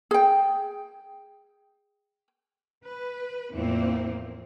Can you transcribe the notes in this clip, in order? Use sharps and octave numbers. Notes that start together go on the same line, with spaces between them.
G#4 G5
B4
E2 A2 E3 F3 A#3 C4